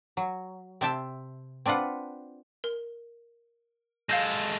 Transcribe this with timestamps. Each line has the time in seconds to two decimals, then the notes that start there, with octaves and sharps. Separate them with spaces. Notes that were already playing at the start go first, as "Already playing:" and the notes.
0.17 F#3
0.81 C3 C4 E5 G5 A5
1.66 C4 D4 F4 B4 F#5
2.64 A#4
4.09 G#3 A4 F5 G6 A#6